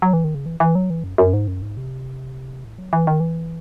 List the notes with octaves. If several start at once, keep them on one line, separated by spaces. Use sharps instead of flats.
F#3
E3
D#3
C#3
E3
E3
F#3
E3
F#2
F#2
G#2
F#2
G#2
C3
A2
F#3
E3
D#3
E3